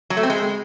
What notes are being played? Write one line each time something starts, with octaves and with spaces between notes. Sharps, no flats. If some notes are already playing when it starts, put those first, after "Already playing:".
F#3
A3
C4
G#3